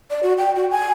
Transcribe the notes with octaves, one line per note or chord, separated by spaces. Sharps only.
D5
F#4
G5
F#4
G#5